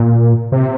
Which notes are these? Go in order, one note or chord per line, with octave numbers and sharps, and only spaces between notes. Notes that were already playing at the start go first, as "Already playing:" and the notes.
Already playing: A#2
C3